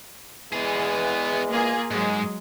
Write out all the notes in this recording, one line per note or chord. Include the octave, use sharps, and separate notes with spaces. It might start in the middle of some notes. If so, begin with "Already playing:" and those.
E2 E3 G#3 B3 G#4
A#3 F4 G#4
G#2 F#3 G#3